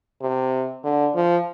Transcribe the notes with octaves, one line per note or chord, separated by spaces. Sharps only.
C3
D3
F3